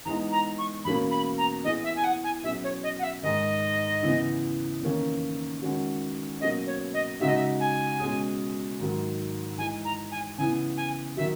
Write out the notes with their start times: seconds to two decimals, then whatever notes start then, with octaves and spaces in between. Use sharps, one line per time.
0.05 E3 G#3 B3 D#4 A#5
0.32 A#5
0.58 C#6
0.85 E2 B2 A#3 C#4 B5
1.11 B5
1.38 A#5
1.64 E3 B3 E4 G#4 D#5
1.84 E5
1.96 G#5
2.04 F#5
2.24 G#5
2.43 B2 F#3 C#4 G#4 E5
2.64 C#5
2.83 D#5
2.99 F#5
3.03 E5
3.23 G#2 D#3 G#3 D#5
4.02 E2 C#3 E3 B3 E4
4.82 E2 D#3 A#3 C#4
5.62 D#3 G#3 C#4 F#4
6.40 B2 F#3 A#3 C#4 D#5
6.67 C#5
6.94 D#5
7.20 C#3 G#3 D#4 F#4 E5
7.28 D#5
7.35 E5
7.60 G#5
7.99 B2 G#3 C#4 G#4
8.79 G#2 D#3 F#3
9.58 E3 G#3 D#4 G#5
9.85 A#5
10.12 G#5
10.38 C#3 E3 B3 E4 G#5
10.77 G#5
11.17 D#3 F#3 E5